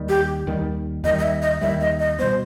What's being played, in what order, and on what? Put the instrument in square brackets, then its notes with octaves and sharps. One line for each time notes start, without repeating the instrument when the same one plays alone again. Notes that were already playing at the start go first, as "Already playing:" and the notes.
Already playing: [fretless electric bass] D#2 D#3 G3
[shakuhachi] G4
[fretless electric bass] D#2 D#3 G3
[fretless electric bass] D#2 D#3 G3 [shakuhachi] D#5
[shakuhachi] D#5
E5
D#5
[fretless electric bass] D#2 D#3 G3 [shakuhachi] E5
[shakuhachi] D#5
D#5
[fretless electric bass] B2 G3 B3 [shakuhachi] C5